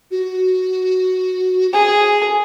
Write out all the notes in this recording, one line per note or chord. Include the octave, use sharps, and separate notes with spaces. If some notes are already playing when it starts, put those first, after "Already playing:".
F#4
G#4 G#5